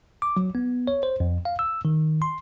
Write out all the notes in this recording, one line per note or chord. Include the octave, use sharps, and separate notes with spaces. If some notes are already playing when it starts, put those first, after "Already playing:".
D6
F#3
B3
C#5
C5
F2
F5
E6
D#3
C6